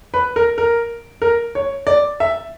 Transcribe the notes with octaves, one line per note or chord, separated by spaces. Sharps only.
B4
A#4
A#4
A#4
C#5
D5
E5